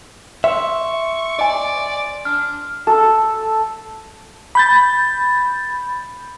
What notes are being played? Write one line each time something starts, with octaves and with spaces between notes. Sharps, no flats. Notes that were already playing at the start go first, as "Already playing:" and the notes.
E5 C6 C#6
D5 D#5 G#5
D4 F6
A4
B5 G6 A6